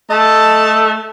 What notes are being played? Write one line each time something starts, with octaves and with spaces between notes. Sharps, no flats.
A3 D#5 A5